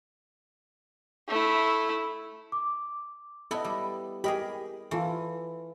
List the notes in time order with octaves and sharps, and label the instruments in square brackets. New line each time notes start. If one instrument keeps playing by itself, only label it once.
[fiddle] A3 E4
[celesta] D6
[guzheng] B3 E4 [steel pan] A4 D#5
[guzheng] G3
[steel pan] G4 D#5 [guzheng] G#4 A#4 B5
[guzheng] E3 [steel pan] F4 A4 C#6